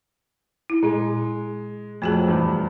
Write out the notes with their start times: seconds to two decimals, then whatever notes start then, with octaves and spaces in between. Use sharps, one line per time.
0.70 E4
0.83 A#2 G#3
2.02 F2 F#3 A3 F#4 G#4
2.28 E2 G2